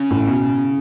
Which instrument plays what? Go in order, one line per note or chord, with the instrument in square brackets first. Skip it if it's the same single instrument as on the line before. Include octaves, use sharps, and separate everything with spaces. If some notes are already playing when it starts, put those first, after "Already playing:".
Already playing: [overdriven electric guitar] C#3
[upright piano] A2
B2